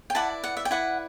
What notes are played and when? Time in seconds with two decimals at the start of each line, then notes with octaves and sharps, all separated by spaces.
0.10 G5
0.15 E4 B4 D5 F#5 A5
0.44 F#5
0.57 E5
0.65 G5
0.71 E4 B4 D5 F#5